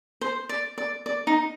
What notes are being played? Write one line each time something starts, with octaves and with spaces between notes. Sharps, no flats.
C5
D5
D5
D5
D#4